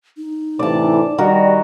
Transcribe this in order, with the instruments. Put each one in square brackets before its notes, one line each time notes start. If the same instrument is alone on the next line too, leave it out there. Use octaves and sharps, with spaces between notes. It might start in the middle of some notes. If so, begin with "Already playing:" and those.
[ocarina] D#4
[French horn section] A2 C3 E3 [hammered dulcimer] D5 A5
[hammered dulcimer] D#3 F#4 A#4 [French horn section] G3